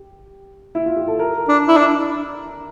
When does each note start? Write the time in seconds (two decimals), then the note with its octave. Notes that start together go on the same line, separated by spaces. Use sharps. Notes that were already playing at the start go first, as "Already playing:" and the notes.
Already playing: G4
0.75 E4
0.86 F4
0.97 G4
1.07 A4
1.19 A#4
1.48 D4
1.68 E4
1.77 D4